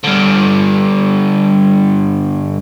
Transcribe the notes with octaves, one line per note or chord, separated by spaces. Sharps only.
G2 D3